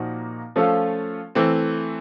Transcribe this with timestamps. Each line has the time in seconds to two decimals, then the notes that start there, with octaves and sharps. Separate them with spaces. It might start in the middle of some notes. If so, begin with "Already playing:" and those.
Already playing: A#2 F3 A#3 D#4 F#4
0.56 F3 A3 C#4 F4 A4
1.35 E3 A3 C4